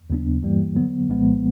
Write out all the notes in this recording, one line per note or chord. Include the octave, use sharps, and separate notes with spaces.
D#2 C#3 F#3 B3 D4
G2 E3 G3 A#3
D3 F#3 B3
C2 A#2 F3 G#3 B3